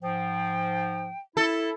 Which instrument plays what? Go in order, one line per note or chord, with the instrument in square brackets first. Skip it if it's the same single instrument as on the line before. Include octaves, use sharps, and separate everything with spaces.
[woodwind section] G#2 F3 [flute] G5
[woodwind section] E4 [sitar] A4